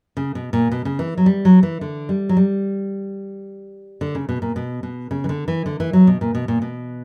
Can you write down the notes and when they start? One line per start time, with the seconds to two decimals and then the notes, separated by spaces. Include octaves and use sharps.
0.17 C#3
0.35 B2
0.53 A#2
0.71 B2
0.85 C#3
0.99 E3
1.17 F#3
1.26 G3
1.45 F#3
1.63 E3
1.81 D3
2.09 G3
2.29 F#3
2.37 G3
4.01 D3
4.15 C#3
4.29 B2
4.42 A#2
4.56 B2
4.83 B2
5.11 C#3
5.24 E3
5.29 D3
5.48 E3
5.66 D3
5.80 E3
5.93 F#3
6.07 B2
6.21 A#2
6.35 B2
6.48 A#2
6.62 B2